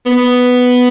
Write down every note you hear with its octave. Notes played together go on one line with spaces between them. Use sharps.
B3